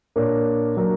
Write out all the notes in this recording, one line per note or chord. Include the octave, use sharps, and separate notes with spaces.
A#2 A#3 D4 A#4 C#5
F#3 A#3 D4 A#4